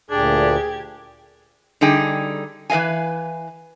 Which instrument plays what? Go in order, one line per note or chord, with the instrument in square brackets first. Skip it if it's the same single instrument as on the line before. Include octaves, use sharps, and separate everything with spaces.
[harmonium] D2 A#2 [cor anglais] D4 [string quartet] G4 G#6 [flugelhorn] G#4
[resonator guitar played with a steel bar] D3 G3 D#4 G#4 G5
E3 B4 D#5 F5 G#5